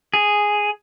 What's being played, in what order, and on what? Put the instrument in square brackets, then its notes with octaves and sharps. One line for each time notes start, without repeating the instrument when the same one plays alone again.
[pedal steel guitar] G#4